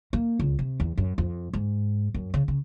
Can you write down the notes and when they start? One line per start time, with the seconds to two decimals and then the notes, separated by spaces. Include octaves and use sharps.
0.13 A#3
0.39 C#2
0.59 C3
0.80 E2
0.97 F#2
1.18 F2
1.53 G#2
2.14 F#2
2.34 C#3
2.48 C#3